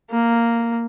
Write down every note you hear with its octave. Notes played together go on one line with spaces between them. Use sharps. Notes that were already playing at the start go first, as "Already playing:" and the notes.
A#3